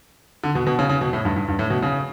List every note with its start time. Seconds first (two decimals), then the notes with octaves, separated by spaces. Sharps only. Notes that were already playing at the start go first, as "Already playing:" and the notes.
0.44 D3
0.55 B2
0.67 B2
0.79 C#3
0.90 C#3
1.01 B2
1.13 A2
1.25 G2
1.36 G2
1.48 G2
1.59 A2
1.70 B2
1.82 C#3